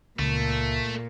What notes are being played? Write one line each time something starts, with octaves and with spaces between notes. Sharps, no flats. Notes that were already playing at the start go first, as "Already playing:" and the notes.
C#2 A#2 A3